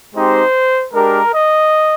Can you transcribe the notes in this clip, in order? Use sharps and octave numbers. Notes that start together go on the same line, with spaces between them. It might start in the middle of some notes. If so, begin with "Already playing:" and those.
G#3 C4 D#4 G4 C5
G#3 D4 G4 A#4
D#5